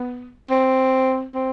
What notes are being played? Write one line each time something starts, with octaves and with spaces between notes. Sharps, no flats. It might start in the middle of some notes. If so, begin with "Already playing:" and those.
Already playing: B3
C4
C4